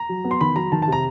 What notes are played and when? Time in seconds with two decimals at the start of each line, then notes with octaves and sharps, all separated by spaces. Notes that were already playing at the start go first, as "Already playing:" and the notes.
Already playing: A#5
0.09 F#3
0.24 B3
0.31 C6
0.41 D#3 B5
0.56 F#3 A#5
0.72 D#3 A5
0.82 A5
0.88 C3 A#5